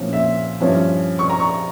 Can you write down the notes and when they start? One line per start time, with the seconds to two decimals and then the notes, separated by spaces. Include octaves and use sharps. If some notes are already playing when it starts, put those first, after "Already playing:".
Already playing: A#2 F3 A#3 C#4 E4
0.13 E5
0.61 G2 F3 C#4 E4
1.19 C#6
1.30 A#5
1.40 C#6